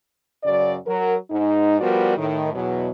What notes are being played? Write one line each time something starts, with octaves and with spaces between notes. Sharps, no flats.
F#2 C#3 F#3 D5
F#3 A#4
G#2 D#4
F3 G3 B3 F#4 A#4 D5
A2 D#3
E2 B2 F#3